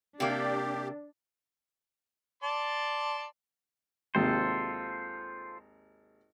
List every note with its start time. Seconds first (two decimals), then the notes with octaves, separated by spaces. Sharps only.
0.20 C3 A#3 D4 G4
2.43 D5 A5 C6
4.15 G#1 D#2 C3 F4 A4 C5